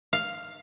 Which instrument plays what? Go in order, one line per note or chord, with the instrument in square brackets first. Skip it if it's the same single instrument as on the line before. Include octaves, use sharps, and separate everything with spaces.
[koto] F5